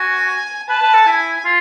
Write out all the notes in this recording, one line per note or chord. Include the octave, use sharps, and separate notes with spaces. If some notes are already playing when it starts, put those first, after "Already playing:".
Already playing: F#4 G#5
B4 A5
B4
A4
E4 G#5
F4